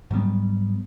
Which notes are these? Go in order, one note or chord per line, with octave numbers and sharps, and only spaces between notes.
G#2 F#3 G3 B3